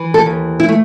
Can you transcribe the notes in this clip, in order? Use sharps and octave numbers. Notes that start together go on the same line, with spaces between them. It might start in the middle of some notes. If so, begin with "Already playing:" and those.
Already playing: E3
A4
D#2
E4
A3